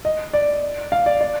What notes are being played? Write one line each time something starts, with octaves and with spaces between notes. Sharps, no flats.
D#5
D5
F5
D5
D5